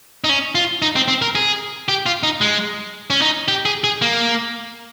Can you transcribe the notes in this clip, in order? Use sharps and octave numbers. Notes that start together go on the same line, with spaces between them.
D#4
C#4
F4
D#4
C4
C4
A#4
G#4
G4
F4
D#4
G#3
C#4
D#4
G4
G#4
G#4
A#3